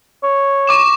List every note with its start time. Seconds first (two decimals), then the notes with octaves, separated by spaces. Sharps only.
0.23 C#5
0.67 C#6 D6 E7